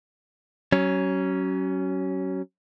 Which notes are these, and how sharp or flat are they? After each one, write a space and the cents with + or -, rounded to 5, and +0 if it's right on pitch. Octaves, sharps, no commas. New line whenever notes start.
F#3 +30 C#4 +0